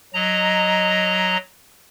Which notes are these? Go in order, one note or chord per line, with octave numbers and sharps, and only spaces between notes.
F#3 D#5 A#5